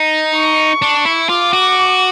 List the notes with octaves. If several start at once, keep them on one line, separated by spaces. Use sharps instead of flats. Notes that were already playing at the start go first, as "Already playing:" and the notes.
Already playing: D#4
C#6
D4
E4
F4 D6
F#4